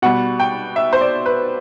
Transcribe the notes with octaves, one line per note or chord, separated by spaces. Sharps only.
B2 G3 F#5
G5
E5
C5
D5
B4